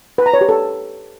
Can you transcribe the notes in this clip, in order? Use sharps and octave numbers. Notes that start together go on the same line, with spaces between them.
B4
A#5
C#5
G4
A4